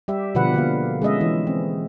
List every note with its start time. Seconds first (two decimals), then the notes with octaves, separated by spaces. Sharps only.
0.08 G3 G4 E5
0.35 B2 D3 F3 B4 F#5
0.54 D3 A#3 F5
1.02 G#3 C#4 D#5 E5
1.21 E3
1.47 C4